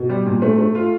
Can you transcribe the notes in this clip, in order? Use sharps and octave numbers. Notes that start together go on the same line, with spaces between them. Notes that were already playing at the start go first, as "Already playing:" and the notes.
Already playing: B2
G3
A#2
A3
A3
F4